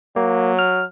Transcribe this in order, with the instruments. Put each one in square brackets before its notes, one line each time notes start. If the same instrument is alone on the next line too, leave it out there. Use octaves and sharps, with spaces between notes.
[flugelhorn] F#3 [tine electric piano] A#3
[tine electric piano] F6